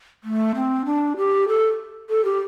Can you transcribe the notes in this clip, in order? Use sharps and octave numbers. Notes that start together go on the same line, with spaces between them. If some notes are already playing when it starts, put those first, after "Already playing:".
A3
C4
D4
G4
A4
A4
G4